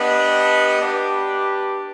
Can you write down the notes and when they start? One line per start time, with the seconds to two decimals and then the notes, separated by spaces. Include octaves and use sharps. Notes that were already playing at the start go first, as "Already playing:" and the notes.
Already playing: B3 D4 G4 B4 D#5
0.81 D4 G4 B4